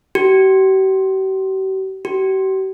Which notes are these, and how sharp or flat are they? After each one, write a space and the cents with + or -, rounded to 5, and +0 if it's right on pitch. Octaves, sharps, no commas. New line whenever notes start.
G4 -45
G4 -45